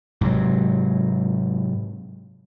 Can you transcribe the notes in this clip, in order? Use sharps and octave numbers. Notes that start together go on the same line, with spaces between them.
G#2 C3 F#3